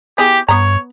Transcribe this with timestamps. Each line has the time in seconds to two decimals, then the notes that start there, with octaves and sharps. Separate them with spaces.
0.18 B3 E4 G4 G#4
0.48 G2 B3 C#5 A#5